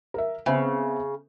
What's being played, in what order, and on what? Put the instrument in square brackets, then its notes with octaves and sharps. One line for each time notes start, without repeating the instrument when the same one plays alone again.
[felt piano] A#4 E5
[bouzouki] C#3 [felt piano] B3 C4 E5